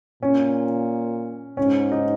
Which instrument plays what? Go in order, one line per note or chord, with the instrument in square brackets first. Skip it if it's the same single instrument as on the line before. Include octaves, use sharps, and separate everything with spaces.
[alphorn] A#2 [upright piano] C#4
[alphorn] G#2 [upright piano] C#4
[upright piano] D#4